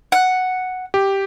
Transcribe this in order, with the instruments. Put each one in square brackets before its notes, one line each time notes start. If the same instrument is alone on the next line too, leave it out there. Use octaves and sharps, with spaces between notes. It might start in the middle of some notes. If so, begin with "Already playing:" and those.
[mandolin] F#5
[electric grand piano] G4